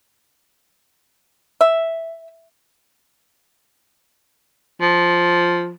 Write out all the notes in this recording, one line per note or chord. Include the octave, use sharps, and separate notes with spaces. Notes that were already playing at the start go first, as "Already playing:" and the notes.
E5
F3